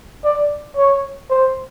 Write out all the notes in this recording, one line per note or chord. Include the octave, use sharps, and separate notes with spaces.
D5
C#5
C5